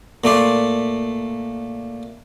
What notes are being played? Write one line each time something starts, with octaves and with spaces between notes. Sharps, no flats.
A#2 A3 D5 C6